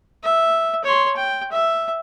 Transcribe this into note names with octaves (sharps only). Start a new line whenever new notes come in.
E5
C#5 C6
G5
E5